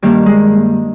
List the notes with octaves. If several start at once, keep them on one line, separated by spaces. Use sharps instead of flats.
G2 D#3 G3 A#3
G#3